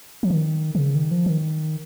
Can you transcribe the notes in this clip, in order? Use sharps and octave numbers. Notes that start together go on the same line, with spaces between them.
F3
D#3
D#3
C#3
D#3
F3
D#3